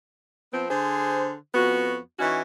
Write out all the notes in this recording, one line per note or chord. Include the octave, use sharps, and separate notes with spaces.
F3 B3 C4
D3 G#4 C5
F2 B3 F#4
E3 C#4 D#4 F#4